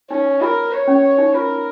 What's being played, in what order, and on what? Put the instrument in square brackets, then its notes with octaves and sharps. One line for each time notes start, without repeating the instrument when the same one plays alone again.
[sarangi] C#4 [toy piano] D#4
[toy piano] F4 [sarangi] A#4
[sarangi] C#5
[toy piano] C#4
D#4
[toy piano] F4 [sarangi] A#4
[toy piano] F4